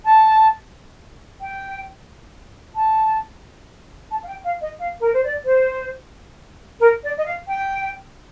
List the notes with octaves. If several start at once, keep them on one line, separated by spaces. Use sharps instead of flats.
A5
G5
A5
A5
F5
G5
F5
D#5
F5
A#4
C5
D5
C5
A#4
D5
D#5
F5
G5